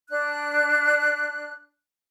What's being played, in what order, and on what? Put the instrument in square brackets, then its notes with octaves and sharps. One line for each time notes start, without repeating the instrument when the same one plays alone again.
[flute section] D4 F#6